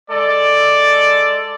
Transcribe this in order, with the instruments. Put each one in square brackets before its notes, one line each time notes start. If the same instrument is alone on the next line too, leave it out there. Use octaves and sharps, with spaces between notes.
[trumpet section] G#3 A4 D5